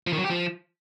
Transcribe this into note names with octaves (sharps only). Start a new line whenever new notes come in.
F3
D#3
F#3
G4
F3